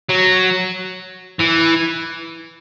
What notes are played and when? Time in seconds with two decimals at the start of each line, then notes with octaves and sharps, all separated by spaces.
0.09 F#3
1.40 E3